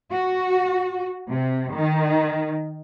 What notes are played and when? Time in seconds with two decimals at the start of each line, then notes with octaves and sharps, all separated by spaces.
0.12 F#4
1.30 C3
1.72 D#3